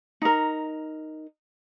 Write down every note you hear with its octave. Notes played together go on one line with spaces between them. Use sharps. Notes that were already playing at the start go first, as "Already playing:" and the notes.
D#4 A#4